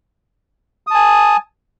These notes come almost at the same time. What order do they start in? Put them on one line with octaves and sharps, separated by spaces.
D#6 A5 G#5